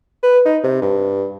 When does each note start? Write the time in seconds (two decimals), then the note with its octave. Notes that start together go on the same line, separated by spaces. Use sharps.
0.23 B4
0.46 D#4
0.64 C3
0.82 G2